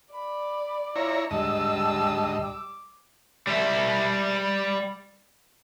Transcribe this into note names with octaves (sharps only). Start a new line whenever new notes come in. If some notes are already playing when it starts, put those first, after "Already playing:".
D5 B5
E4 F4 C#5 A#5
D2 G#2 G3 D#5 A5 E6
D6
G3 E5